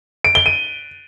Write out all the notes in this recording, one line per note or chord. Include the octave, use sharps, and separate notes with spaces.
D7
G7
D#7